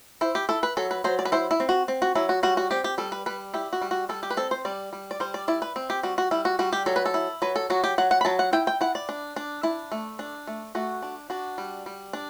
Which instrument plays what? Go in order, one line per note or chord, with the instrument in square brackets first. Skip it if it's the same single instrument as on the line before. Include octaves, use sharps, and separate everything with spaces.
[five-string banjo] E4 C5
G4
E4 A4
B4
F#3 A4
B4
F#3 C5
D5
B4
E4 C5
E4
C4
F#4
C4
F#4
F#3 E4
F#4
G3 F#4
F#4
C4 G4
G4
G3 A4
B4
G3 B4
E4 G4
F#4
G3
F#4
G3 A4
G4
B4
C4 A4
C5
G3 D5
G3
D5
G3 C5
D5
E4 D5
B4
C4
G4
G3 F#4
F#4
G3 E4
F#4
G3 F#4
G4
F#3 A4
B4
A4
E4
F#3 B4
A4
F#3 F#4
G4
F#3 F#5
F#5
B5
F#3 A5
F#5
E4 G5
G5
E4 F#5
D5
D4
D4
D4 E4
A3
D4
A3
A3 F#4
D4
D4 F#4
G3
G3
D4